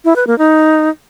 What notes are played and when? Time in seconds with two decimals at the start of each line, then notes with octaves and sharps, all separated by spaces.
0.05 E4
0.16 B4
0.27 A#3
0.38 D#4